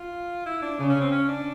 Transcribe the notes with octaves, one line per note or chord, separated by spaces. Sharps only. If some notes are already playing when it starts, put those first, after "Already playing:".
Already playing: F4
E4
D4
C#3 D4
C#4
C4
C#4
D4